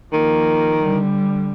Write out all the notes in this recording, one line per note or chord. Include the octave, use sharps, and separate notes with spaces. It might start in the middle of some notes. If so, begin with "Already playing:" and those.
D#3 F3 A#3
D3 G3